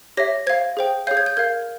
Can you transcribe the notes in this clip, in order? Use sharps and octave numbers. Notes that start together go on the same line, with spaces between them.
G4 C#5 E5 A#6
C5 F5 G#6
G#4 C5 G5
G#4 C#5 F5 G6
G#6
G6
A#4 F5 G#6